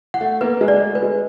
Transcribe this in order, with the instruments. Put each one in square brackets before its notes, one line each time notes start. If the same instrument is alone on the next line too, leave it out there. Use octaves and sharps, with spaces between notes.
[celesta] F#5
[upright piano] A3
[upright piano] A#3 [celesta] B4
[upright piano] G#3
[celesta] D5
[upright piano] A3
[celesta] B4
[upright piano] G#3